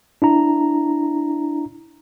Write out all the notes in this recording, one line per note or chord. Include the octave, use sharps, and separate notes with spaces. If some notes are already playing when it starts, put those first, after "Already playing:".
D4 E4 A#5